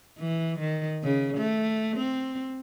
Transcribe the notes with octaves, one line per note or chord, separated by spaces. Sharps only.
E3
D#3
C#3
A3
C4